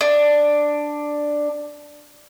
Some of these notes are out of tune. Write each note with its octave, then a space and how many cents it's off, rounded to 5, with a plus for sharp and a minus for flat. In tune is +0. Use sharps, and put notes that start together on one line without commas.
D4 +5